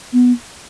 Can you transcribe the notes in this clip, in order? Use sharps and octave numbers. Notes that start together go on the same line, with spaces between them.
B3